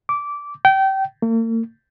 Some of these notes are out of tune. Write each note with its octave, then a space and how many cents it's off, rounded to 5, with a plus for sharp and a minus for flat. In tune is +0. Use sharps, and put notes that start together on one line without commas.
D6 -15
G5 -25
A#3 -45